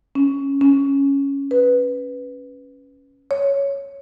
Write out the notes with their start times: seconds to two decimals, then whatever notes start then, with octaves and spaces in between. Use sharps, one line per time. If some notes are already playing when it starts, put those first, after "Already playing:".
0.15 C#4
0.61 C#4
1.51 B4
3.31 C#5